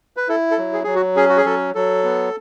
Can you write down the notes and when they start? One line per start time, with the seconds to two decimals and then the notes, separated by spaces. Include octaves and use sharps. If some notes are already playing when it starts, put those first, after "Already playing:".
0.17 B4
0.28 E4 A4
0.51 A4
0.58 F#3
0.73 G#4
0.84 F#3 G#4
0.95 F#4
1.16 C#4 G#4
1.29 F#4
1.37 G#4
1.45 F#3 A4
1.75 F#3 A4
2.04 B3